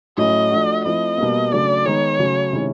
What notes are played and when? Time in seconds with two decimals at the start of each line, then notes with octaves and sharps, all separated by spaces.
0.17 A2 F#3 A3 C#4 E4 D#5
0.51 F3 A3 D4 F#4
0.85 F3 A3 C4 E4 D#5
1.18 B2 G3 A#3
1.52 C#3 F#3 A3 D4 D5
1.85 D#3 G#3 B3 D#4 C#5
2.19 C#3 F#3 A3
2.53 C3 D#3 G#3 C#4 E4